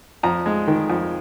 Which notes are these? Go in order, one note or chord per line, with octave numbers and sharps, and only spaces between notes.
F2 A#5
G#3
D#3
F2